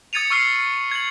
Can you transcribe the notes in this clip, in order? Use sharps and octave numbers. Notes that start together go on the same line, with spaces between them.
D#6 G#6 A6 C#7 D#7 F7
C#6 E6 F6 C7
G#6 F#7